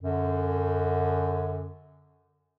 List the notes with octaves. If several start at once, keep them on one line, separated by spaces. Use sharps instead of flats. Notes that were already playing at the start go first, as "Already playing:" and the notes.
F#2 D3